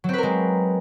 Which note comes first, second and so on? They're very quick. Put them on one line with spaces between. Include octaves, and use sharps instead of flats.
F#3 C4 B4 A#4 G#3